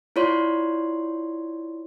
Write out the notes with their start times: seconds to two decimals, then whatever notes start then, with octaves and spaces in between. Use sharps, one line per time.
0.16 E4 F4 C#5 D5 C6